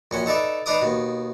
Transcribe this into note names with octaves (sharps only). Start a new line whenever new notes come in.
A#1 C#4 F#4
D#4 A4 B4 D5 E5
D4 D#4 B4 A#5 D6 D#6
D#2 B2